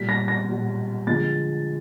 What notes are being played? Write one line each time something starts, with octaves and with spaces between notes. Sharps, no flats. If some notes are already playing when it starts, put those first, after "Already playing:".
Already playing: A#2 G3 B6
A#6
A#6
A#2 G3
D3 F3 G#3 A6